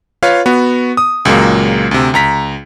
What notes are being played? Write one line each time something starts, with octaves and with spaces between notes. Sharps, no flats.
F4 B4 C#5 F5
B3 F#4
D#6
C#2 A#2 F#3 G#3 A#3
D2 C3
C#2 A#5 B6